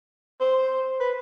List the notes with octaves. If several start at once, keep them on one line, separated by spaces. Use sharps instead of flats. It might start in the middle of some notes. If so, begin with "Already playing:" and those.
C5
B4